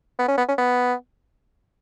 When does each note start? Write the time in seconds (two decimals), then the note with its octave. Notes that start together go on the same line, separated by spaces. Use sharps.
0.19 B3
0.28 C#4
0.38 B3
0.48 C#4
0.58 B3